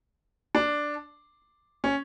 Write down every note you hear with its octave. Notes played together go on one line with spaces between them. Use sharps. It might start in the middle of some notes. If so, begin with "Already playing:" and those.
D4
C#4